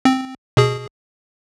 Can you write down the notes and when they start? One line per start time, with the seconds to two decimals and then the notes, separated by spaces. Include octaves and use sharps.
0.05 C4
0.57 B2 G#4